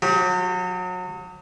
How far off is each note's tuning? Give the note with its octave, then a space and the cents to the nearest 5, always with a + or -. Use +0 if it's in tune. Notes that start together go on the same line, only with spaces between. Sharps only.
F#3 -30 G4 +0